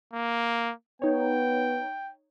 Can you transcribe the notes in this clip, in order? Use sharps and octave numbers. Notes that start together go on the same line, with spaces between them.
A#3
B3 D#4 C#5 G5